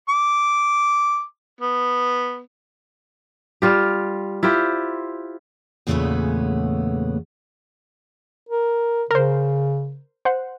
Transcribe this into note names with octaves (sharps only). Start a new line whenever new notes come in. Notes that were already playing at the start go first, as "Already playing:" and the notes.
D6
B3
G3 F4 G4
E4 F4 G4 C5
E2 A#2 C#3 A3 B3 C#4
A#4
C#3 A#4 C5
C5 F#5